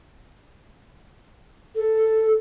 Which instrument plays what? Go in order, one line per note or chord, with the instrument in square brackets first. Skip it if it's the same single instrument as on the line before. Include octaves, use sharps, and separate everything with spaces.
[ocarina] A4